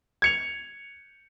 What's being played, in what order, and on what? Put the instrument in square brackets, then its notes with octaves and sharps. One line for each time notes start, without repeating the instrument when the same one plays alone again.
[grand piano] G#6 C#7 F7